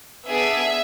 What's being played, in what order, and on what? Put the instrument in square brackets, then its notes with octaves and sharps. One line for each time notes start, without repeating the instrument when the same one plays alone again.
[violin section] B3 D4 G#4 E5